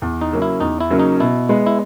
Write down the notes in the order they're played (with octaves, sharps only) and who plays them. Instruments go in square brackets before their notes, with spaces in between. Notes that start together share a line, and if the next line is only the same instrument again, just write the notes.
[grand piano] E2
[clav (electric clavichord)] D#4
[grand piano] C#3 F#3 A#3 C#4
[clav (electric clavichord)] E4
[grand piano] E2 [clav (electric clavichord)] D#4
[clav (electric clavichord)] E4
[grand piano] C#3 F#3 A#3 C#4
[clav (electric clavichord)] D#4
[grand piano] B2 [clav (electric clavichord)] E4
[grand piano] G#3 B3
[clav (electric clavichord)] E4